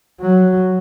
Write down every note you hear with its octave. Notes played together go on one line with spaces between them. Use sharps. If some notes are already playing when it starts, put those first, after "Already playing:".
F#3